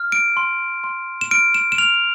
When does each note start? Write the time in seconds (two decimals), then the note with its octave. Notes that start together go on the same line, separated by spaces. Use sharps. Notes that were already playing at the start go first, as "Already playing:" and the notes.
Already playing: F6
0.12 D7
0.37 C6
0.84 C6
1.21 E7
1.31 F6 D7
1.54 E7
1.72 E7
1.78 F6 F7